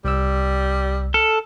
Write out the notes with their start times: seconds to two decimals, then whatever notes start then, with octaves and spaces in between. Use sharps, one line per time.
0.05 C2 G3 E6
1.14 A4 F6